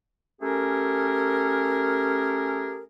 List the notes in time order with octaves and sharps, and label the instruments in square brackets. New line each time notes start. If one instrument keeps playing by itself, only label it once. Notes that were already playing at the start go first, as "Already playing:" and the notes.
[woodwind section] A3 C#4 G4 G#4 A#4